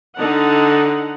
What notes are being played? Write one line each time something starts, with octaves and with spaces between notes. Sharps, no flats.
D3 D#4 F#5